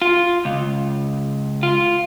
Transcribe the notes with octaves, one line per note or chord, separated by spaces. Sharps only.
F4
C#2
F4